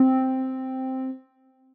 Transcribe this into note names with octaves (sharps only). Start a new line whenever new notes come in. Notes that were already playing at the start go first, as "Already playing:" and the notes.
Already playing: C4